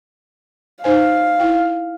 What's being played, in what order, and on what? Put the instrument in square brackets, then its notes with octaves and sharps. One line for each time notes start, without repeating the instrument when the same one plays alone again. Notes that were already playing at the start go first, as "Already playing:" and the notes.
[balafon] D#4 C5 G#5 [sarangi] F5
[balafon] E4 G5